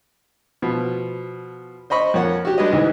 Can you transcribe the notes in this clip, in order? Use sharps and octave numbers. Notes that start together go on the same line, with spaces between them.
B2 F3
C5 D#5 B5 C#6
F2 A#3 C#5 F#5
F#4 G4
G3 G#3 D4 B4 D#5
D2 G#2 E3 D#4